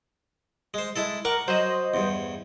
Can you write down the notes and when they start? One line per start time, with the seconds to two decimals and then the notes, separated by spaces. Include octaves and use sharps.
0.74 G#3 C5
0.96 G#3 E4 A4
1.25 A#4 F#5 C#6 D6
1.48 F#3 C5 D#5
1.94 E2 G2